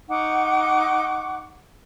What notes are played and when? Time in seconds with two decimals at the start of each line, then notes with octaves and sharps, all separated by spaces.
0.09 D#4 F#5 C#6 D6